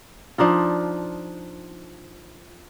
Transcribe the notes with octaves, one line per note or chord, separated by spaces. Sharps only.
F3 D4 D#4 F4